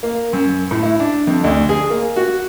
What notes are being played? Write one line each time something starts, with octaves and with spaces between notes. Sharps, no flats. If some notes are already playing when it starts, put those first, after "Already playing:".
A#3
F#2
A2
E4
D4
F2
D2
G#4
A#3
F#4